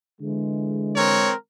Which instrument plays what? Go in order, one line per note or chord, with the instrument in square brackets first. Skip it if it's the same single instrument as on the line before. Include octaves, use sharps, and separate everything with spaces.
[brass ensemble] D3 E3 G#3
[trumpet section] C4 A#4 C#5